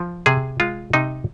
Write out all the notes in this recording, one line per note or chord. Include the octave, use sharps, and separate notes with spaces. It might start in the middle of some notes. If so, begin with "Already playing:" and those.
Already playing: F3
C3 G#4
G#3 F4
C3 D#4